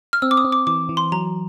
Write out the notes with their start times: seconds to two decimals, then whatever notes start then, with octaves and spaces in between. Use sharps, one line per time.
0.13 F6
0.22 C4 E6
0.31 D6
0.37 D#6
0.44 C4
0.52 D6
0.67 E3 D6
0.89 E3
0.97 C6
1.12 F#3 A#5